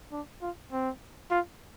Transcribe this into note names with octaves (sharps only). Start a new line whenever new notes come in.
D4
F4
C4
F4